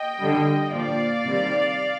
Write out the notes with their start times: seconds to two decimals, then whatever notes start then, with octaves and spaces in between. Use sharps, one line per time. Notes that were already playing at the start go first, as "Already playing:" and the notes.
Already playing: D#5 G5
0.18 D3 G3
0.71 A#2 F3 D5 F5
1.25 C3 D#3 G3